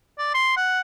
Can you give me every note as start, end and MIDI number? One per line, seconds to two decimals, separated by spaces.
0.18 0.31 74
0.35 0.52 84
0.57 0.80 78